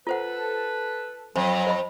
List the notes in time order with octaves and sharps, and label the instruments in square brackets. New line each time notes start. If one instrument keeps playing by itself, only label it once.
[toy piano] F4 C5 F#5 [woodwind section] A4 B4
[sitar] F2 [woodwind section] F#3 [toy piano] C5
[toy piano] C5 D#5 B5